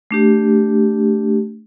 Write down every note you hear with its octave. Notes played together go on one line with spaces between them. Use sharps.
A3 D4 G4